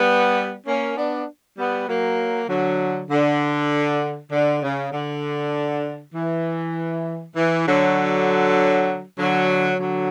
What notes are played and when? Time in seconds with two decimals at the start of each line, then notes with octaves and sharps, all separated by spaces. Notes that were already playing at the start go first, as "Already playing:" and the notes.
Already playing: G3 B3
0.66 A#3 C#4
0.97 B3 D4
1.57 G3 B3
1.88 F#3 A#3
2.49 D3 F#3
3.10 D3
4.32 D3
4.63 C#3
4.93 D3
6.15 E3
7.36 E3
7.67 D3 F#3
9.19 D3 F#3
9.80 D3 F#3